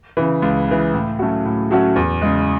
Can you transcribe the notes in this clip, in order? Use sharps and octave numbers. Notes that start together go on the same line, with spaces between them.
C#3 E3
C#2
C#3 E3
A2
F#3 A3 C#4 F#4
A2
F#3 A3 C#4 F#4
E2
C#3 G#3